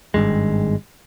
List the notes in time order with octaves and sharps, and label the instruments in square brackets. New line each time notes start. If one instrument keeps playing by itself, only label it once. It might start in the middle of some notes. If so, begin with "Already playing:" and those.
[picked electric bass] G#1 C#2 G2 G#3